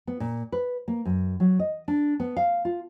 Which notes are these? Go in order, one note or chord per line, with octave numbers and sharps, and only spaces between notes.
B3
A#2
B4
A#3
F#2
F#3
D#5
D4
B3
F5
F4